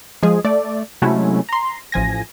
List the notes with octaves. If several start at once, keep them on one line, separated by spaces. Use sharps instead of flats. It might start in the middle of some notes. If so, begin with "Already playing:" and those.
F3 G#3 G#4
A3 D5
C3 F#3 G#3 A3 C#4 E4
A#5 C6
A1 F3 G#5 A#6